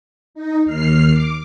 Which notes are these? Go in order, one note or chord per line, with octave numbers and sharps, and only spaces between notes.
D#4
D#2 F6 C7
D6